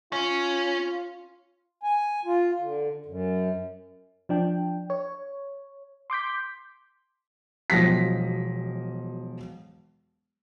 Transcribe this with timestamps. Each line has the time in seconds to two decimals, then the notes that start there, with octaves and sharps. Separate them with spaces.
0.13 C#4 F4
1.83 G#5
2.25 F4
2.60 D3
3.06 F#2
4.29 F3 D4 G5
4.90 C#5
6.10 C6 D6 G6 B6
7.70 E1 B1 F3 A#6 B6